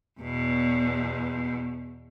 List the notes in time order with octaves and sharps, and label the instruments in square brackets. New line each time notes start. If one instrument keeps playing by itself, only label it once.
[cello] E2 B2